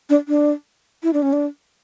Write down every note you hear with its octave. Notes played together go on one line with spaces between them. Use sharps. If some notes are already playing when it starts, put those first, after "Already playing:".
D4
D4
E4
D4
C#4
D4